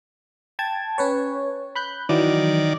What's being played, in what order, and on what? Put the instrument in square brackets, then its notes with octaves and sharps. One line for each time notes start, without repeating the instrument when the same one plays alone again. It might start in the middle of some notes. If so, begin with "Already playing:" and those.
[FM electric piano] G5 A5 G#6
C#4 B4 C#5
B5 F#6 G6
[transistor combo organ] D#3 D5 [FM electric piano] E3 F#3